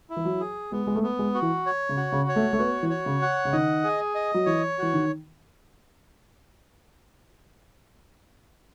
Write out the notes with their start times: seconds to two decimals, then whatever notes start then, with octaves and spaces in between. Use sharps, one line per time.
0.10 E4
0.16 E3
0.25 F#3
0.40 G#4
0.72 G#3 B3
0.87 G#3
0.96 A3
1.03 B3
1.19 G#3
1.35 F#4
1.42 E3
1.66 C#5
1.89 C#3
1.97 F#4
2.12 C#3
2.29 C#5
2.36 A3
2.53 A3
2.59 B3 F#4
2.83 E3
2.90 C#5
3.06 C#3
3.22 F#5
3.45 C#3
3.53 D#3 D#5
3.84 G#4
4.15 D#5
4.34 F#3
4.46 E3 C#5
4.78 E3 F#4
4.93 D#3